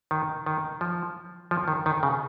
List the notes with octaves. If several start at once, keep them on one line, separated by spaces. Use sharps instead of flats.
D#3
D#3
F3
F3
D#3
D#3
C#3